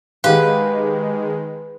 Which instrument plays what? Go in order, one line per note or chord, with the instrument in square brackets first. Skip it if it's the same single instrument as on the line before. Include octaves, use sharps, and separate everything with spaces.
[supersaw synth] D#3 G#3 [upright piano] G4 G#4 [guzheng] B4 [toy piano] F5 F#5